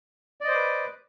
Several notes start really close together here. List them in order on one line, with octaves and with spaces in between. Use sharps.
D5 D#5 C5 D6 B4